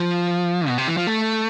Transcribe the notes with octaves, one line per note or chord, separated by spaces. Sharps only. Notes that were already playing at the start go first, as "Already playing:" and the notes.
Already playing: F3
B2
C3
E3
F3
A3